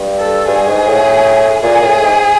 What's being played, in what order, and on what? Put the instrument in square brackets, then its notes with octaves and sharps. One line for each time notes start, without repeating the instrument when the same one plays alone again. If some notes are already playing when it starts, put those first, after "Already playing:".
Already playing: [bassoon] G2
[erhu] A4
[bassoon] G2 [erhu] G#4
[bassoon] G#2
A2
[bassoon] A#2 [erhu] G#4
[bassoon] A2
G#2